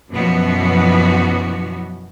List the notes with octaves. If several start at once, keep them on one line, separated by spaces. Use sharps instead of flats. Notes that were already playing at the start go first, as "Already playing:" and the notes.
F#2 B2 E3 F3 B3 F#4